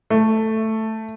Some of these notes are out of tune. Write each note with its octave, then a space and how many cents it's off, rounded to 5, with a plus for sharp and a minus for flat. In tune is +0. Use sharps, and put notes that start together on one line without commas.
A3 +5